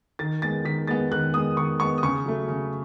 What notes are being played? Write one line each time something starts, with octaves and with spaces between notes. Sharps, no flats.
D#3 A6
G#3 B3 A6
D#3 B6
G#3 B3 A6
D#3 F#6
G#3 B3 D#6
D#3 C#6
G#3 B3 C#6
D#6
C#3 C#6
F#3 A3
C#3